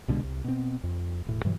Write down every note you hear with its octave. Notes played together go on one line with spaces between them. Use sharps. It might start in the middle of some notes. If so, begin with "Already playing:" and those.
C2 B2 D3 G#3
C2
B2 C4
F2
E1 A2
G2 B2 E3 F#3